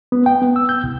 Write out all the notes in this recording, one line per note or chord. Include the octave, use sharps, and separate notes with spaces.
B3
G5
B3
E6
G6
C2